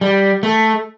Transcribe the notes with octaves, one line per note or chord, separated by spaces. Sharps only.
G3
A3